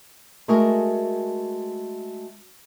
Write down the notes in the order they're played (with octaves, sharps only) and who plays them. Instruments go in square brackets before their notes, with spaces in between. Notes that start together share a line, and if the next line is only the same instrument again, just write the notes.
[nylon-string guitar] G#3 A3 F#4 G#4 A#4